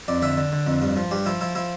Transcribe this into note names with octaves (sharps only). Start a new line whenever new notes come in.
F2 D5
D3 E5
D3
D3
F2
G2
F3
G2 G4
F3 E4
F3 E4
F3 E4